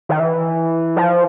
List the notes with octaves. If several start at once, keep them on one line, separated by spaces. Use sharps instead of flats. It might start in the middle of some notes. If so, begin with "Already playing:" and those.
D#3
E3
F3